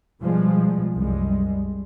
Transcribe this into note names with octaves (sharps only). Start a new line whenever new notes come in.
B2 F3 G3 G#3
C2 F#2 G3 G#3